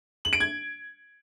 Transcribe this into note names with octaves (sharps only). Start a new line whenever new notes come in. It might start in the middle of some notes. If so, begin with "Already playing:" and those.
F#7
D7
G#6